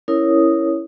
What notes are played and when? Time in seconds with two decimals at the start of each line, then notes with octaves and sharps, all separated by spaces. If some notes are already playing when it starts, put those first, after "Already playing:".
0.08 C#4 E4 A#4 C#5 D#6